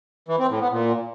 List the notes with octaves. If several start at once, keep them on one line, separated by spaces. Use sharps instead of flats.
E3
C4
A2
B3
A#2